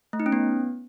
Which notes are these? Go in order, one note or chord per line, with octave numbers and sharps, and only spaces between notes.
A3
D#4
C#4
B3